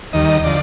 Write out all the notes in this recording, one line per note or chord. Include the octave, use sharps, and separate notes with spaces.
D#2 D#3 G3 D#5
D3 F3 D5